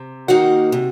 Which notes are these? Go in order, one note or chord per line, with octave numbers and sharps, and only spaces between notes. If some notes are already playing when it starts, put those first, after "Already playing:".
Already playing: C3
D#3 A#3 D#4 F#4 F#5
C3